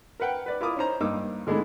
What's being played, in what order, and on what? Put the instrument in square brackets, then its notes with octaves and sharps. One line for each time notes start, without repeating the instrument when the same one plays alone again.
[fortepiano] A#4 B4 F#5 G5
B4 D5
E4 F4 A#4 D6 D#6
C#4 D#4 C5 A#5
G2 A#3 D#4 D6 E6
D3 G#3 A3 B3 E4